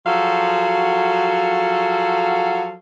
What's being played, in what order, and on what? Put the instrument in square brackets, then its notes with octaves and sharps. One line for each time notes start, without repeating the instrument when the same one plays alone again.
[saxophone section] F3 F#3 F#4 G#4 A4 F5